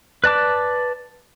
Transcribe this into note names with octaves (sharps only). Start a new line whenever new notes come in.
B4 D5 A5 D6